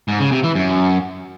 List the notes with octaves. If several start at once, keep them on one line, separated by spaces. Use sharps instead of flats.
G#2
C#3
C3
E3
F#2